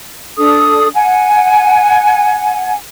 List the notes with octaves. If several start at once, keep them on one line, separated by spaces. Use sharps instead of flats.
D4 A4 D#6
F#5 G#5